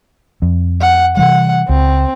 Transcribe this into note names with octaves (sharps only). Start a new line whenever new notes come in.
F2
F#5
C3 E3 G3 F#5
C#2 C4